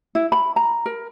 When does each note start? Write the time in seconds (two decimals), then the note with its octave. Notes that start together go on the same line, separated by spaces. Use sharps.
0.15 E4
0.32 B5
0.56 A#5
0.86 A#4